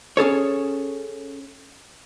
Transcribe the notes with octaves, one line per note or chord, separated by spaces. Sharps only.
C#4 G#4 A4 C#5